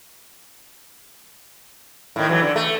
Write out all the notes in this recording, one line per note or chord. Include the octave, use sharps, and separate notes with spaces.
A2 D#3
E3 F#3
D3
A3